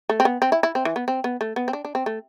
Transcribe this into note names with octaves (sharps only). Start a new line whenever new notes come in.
A3
C4
B3
C4
E4
E4
C4
E3
B3
C4
B3
A3
B3
C4
D4
D4
C4
A3